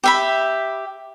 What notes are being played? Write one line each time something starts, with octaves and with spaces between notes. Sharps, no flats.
G4 E5 B5